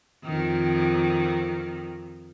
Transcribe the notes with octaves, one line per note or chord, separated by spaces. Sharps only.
F2 D#3